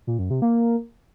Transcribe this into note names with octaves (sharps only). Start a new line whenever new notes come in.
A#2
F#2
C3
A#3